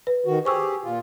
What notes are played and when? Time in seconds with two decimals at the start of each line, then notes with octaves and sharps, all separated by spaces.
0.07 B4
0.26 D#3 F#4
0.45 G4 G#4 C5 C#6 E6
0.84 A#2 F4